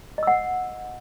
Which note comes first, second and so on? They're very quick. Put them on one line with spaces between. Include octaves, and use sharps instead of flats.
D#5 E6 F#5